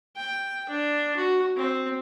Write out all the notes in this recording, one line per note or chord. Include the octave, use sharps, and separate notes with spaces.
G5
D4
F#4
C4